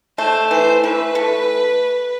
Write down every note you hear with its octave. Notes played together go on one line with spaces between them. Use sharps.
A3 C5
E3 C5
E3 B4
A3